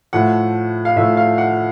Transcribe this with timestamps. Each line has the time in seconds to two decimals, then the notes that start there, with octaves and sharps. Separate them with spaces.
0.13 A2 F3 A3 F#5
0.85 F5
0.96 A2 F3 A3 E5
1.17 F5
1.38 F#5